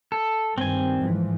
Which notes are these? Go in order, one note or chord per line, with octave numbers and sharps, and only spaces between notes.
A4
G2 D#3 G3 C4 G#5
G#2 E3 F3